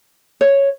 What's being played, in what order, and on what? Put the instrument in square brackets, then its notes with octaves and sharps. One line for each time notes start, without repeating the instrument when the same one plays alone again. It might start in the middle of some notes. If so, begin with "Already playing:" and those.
[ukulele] C#5